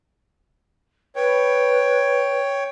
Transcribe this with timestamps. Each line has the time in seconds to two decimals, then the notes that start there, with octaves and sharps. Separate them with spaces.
1.16 B4 C#5 G5